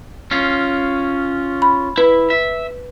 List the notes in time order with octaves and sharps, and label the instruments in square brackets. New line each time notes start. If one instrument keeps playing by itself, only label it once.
[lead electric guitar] C#4 F4
[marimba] B5
[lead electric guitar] E4 [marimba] B4
[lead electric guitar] E5